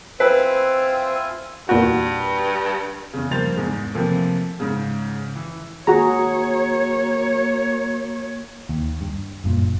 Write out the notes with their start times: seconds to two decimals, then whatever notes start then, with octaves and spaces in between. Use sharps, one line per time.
0.20 C4 E4 F4 B4 G#5
1.69 E2 G2 A#2 F#4
3.13 E2 C#3
3.31 G2 F3 A#3 C5 A6 F7
3.57 E2 G#2 G#3
3.94 C3 E3 F3 A3 A#3
4.60 G#2 C#3
5.36 E3
5.87 D#3 A#3 F#4 G#4 C#5 A#5
8.69 D#2
9.01 G2
9.44 F#1 G2 A#2